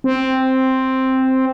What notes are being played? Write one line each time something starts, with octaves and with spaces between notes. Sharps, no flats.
C4